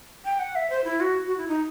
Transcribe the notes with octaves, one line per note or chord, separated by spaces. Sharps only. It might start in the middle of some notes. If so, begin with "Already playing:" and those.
G5
F#5
E5
C5
E4
F#4
F#4
E4
D#4